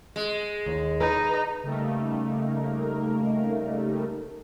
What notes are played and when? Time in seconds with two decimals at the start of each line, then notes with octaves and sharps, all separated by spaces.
0.16 G#3
0.66 D#2
1.01 D#4 B4
1.64 C#3 G3 A3 A#3 D#4 A#4